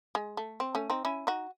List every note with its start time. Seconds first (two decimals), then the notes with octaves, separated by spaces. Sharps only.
0.15 G#3
0.37 A3
0.60 C4
0.75 A3 C#4
0.90 C4 D#4
1.05 C#4 E4
1.27 D#4 F#4